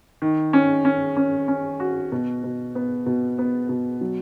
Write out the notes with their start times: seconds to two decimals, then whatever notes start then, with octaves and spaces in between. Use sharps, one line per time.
0.22 D#3
0.53 C#4
0.85 C#4
1.17 C#4
1.48 C#4
1.80 F#4
2.12 B2
2.43 B2
2.75 B3
3.06 B2
3.38 B3
3.69 B2
4.01 F#3